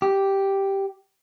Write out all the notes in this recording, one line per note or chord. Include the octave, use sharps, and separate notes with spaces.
G4